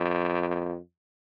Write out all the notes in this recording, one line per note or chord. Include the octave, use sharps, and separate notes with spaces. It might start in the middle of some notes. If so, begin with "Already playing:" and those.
Already playing: F2